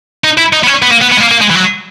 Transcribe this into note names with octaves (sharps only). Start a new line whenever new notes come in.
D#4
E4
D#4
B3
C#4
B3
A#3
B3
B3
G#3
A#3
A#3
G#3
E3
F#3